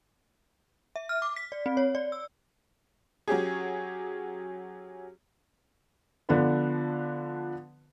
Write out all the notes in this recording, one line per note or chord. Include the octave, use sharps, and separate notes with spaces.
E5
F6
D6
B6
D5
C4
C#5
D5
E6
F#3 C#4 G4 G#4
D3 F3 B3 D4 F4 B4